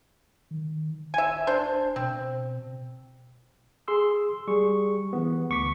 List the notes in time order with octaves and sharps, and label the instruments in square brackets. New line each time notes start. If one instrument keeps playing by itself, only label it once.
[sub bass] D#3
[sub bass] D1 [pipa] E5 G#5
[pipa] D4 C5
[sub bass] B2 [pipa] C4
[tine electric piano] G#4 C6 E6
G3 G#4 C#6
E3 B3
D2 C#6 D6 B6